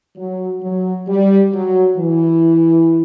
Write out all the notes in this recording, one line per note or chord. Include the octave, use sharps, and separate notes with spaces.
F#3
F#3
G3
F#3
E3